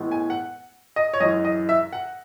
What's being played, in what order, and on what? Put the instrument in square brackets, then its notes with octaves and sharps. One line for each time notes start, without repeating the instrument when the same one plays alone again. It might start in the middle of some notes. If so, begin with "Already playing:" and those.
Already playing: [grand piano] A2 E3 G#3 B3
G#5
F#5
D#5
C#5
F#2 E3 G#3 D#5
D#5
E5
F#5